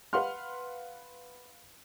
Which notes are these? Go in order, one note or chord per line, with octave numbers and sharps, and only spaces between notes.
B4 F5 F#5 C6 F6